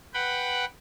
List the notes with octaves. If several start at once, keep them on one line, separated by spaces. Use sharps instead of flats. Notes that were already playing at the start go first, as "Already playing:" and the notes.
B4 F#5 G5 B5